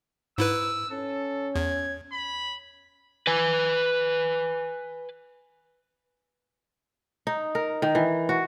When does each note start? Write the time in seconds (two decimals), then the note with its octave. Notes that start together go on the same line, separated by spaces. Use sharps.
0.38 G#2 E4 B4 E6
0.91 C#4 A4
1.55 E2 G#6
2.12 B5
3.27 B4 G#5
7.27 D#4
7.55 A#4
7.82 D#3
7.95 E3
8.29 F#4